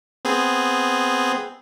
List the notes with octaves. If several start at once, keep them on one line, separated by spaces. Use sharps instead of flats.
B3 C4 G#4